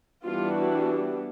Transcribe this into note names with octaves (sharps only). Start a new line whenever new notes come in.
E3 G3 B3 D4 F4
F#4